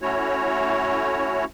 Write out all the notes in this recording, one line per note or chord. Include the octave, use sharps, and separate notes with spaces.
A3 C#4 E4 F#4 C#5